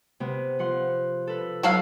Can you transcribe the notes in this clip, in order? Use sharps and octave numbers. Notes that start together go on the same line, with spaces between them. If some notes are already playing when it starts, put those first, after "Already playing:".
C3 B3
F3 F#5 C6
A4 B4
F#3 F#4 A4 F5